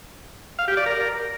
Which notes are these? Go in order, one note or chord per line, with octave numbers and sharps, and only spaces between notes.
F5
G4
D5
A#4